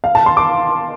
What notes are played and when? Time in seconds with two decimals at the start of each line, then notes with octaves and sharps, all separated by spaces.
0.04 F5
0.15 A5
0.26 C6
0.37 D6